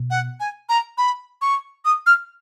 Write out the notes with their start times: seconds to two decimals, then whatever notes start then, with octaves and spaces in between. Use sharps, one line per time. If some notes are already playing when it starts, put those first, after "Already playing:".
Already playing: B2
0.11 F#5
0.40 G#5
0.69 A#5
0.98 B5
1.42 C#6
1.85 D#6
2.06 F6